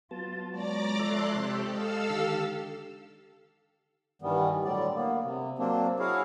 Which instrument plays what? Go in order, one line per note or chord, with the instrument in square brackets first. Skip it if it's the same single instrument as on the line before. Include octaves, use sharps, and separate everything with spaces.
[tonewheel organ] F#3 B3 A5 [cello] F4
[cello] G#3 C#5 [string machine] D5 A#5 D6
[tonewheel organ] F3 A4 E5 [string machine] C6 F#6
[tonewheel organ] C3 C5 E5 [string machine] G4 A4
[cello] G#3 [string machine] A4 F5 E6 [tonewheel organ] D#5
[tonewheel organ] D3 D#3 [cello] G4
[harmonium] G2 D#3 E3 G3 B3
A2 D3 F#3 G3 D5
A#3 B3
C3
F#3 A#3 C4 D4
E4 F#4 G#4 C#5 F5